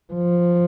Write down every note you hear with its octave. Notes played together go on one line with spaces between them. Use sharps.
F3